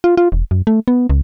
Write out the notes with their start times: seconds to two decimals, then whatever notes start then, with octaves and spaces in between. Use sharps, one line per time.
0.04 F4
0.17 F4
0.32 E1
0.51 F#2
0.67 A3
0.88 B3
1.10 C#2